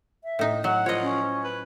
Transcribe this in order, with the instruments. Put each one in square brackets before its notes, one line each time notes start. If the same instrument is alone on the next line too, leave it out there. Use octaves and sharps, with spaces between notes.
[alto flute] E5
[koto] A2 D#4
[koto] F#3 [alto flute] F#5
[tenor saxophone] F3 [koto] C#5 D#5
[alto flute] C#4
[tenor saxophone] B4